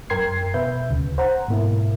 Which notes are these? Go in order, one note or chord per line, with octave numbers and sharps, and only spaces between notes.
F#2 A#4 G5 C6 G#6 C7
B2 B4 E5 G6
D2 C#3
C5 F#5 A#5
G#2 B2 A#3 E4